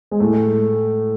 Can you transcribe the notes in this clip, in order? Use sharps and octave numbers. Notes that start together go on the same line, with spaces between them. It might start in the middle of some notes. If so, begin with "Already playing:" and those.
G#3
A2 A3